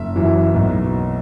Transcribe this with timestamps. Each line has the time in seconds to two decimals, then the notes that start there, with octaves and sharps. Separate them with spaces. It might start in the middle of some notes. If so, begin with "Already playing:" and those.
Already playing: F#1 E5
0.16 F#2 E3
0.54 B1